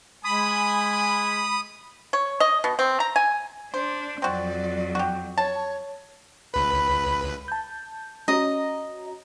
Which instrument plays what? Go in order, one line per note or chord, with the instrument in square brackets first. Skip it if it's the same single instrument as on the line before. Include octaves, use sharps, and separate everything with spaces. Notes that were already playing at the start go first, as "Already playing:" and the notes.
[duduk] G#3 [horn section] G#5 [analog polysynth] B5 [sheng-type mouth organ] D#6
[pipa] C#5
D#5
B2
C4
A#5
G#5
[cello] D4 [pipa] C5
[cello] F2 F#3 [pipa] C4 F#4 [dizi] D5
[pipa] F#4 G4
[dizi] C#5 [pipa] A5
[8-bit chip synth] C#2 B4 [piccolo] B5
[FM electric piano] A5 G6
[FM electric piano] C#4 F#4 A#5 [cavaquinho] D#5